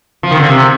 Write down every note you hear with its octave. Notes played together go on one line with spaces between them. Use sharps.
F3
D#3
D3
C3